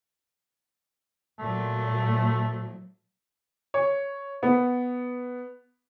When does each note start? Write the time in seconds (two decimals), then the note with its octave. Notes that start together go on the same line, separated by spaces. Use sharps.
1.39 A#2 F#3 A3
3.74 C#5
4.43 B3